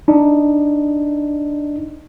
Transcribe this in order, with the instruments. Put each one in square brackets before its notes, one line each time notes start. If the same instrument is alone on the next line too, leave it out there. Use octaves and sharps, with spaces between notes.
[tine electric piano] D4 D#4